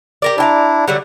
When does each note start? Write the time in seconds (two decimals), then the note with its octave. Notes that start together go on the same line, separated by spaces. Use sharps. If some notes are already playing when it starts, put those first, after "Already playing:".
0.22 G4 A#4 D5
0.38 D4 E4 D5 G5 A#5
0.88 D3 F#3 G3 F#5